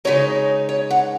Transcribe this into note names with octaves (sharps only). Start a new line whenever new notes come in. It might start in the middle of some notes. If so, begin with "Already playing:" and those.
C#3 G#3 D#4 C#5
C#5
F#5